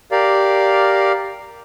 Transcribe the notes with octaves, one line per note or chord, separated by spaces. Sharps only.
G4 A#4 D5 F5